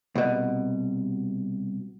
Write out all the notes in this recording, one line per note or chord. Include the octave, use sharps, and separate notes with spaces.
C2 B2